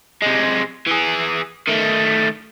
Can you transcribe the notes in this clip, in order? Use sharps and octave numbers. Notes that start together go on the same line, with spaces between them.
C3 G#3
E3 G#4
D#3 A3